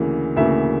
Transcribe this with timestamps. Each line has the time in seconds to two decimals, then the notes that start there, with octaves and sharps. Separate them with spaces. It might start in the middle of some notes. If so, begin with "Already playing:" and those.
Already playing: D2 C#3 E3 A#3
0.36 D2 C#3 E3 A#3 E5